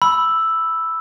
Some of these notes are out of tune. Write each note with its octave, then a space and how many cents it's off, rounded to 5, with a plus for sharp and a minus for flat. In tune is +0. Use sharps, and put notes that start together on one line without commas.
B5 +0 E6 +0